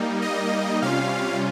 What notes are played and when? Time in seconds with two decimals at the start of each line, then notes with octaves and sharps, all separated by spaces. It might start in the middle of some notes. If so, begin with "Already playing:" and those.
Already playing: G3 A#3 D#4
0.22 D#5
0.82 C3 G3 C#4 F4 F5